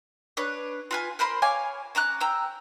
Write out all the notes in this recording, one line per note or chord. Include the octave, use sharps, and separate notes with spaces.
D4 B4 C#5
F4 B4 G#5
A#4 C5 B5 C6
C#5 F5 G#5 D6
C#4 A#5 D6 F#6
G5 A#5 E6